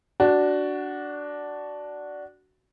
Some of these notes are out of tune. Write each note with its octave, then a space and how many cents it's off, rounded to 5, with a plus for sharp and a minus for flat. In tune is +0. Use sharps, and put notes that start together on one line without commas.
D4 -5 F#4 +10